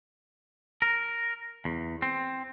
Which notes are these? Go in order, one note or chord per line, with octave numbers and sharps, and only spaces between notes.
A#4
E2
C4